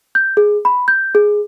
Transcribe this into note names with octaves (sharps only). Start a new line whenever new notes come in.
G6
G#4
B5
G6
G#4